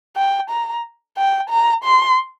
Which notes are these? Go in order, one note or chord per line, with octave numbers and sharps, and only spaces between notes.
G5
A#5
G5
A#5
C6